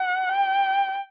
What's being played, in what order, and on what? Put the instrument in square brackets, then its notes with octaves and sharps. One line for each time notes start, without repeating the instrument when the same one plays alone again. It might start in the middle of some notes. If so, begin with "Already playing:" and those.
Already playing: [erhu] F#5
G5